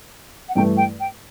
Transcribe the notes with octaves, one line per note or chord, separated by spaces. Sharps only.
F#5
G2 E3 A3 G5
G5
G5